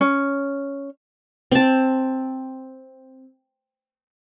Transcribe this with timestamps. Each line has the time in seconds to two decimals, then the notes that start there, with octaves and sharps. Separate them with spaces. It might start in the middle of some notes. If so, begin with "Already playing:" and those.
0.01 C#4
1.52 C4 A5